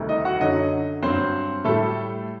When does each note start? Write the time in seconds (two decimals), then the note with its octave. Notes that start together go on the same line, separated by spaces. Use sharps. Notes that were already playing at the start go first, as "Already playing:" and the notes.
Already playing: D2 C3 D#3 G3
0.09 D#4 D#5
0.25 F#4 F#5
0.40 F#2 D3 F#3 D#4 D#5
1.02 G2 F#3 C4 C5
1.64 A2 G3 A3 A4